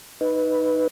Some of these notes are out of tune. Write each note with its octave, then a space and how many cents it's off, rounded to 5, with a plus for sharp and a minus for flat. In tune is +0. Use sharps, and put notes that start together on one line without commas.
D#4 +0 B4 +0